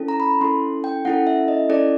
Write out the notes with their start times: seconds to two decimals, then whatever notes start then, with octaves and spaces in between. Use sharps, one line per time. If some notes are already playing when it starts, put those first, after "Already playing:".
Already playing: C#4 E4 A4
0.08 A#5
0.20 B5
0.41 C#4 E4 A4 C6
0.84 G5
1.05 C#4 E4 A4 F#5
1.27 E5
1.48 D#5
1.69 C#4 E4 A4 D5